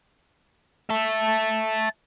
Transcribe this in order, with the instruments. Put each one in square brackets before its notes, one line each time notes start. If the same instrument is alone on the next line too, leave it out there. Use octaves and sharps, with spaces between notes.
[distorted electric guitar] E5 A5